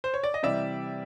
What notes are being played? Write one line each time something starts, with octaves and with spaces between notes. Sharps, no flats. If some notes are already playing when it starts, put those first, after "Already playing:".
C5
C#5
D5
D#5
C3 E3 G3 D5 E5